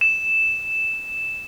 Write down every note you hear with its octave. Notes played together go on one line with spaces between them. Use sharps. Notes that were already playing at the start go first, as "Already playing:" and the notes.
E7